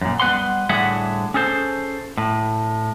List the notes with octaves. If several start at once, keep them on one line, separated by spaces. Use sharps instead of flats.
F#2 A#2
G3 B3 B4 F#5 C6
A2 D3 G3 G#4 E5 F#5
C#4 G#4 A4 C5
A2